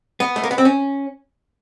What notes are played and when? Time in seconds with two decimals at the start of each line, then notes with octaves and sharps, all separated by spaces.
0.20 B3
0.36 A3
0.43 A#3
0.51 B3
0.58 C4
0.65 C#4